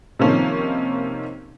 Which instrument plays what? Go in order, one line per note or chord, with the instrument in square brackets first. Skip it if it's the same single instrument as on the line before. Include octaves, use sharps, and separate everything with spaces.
[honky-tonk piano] C3 D#3 F3 A#3 C#4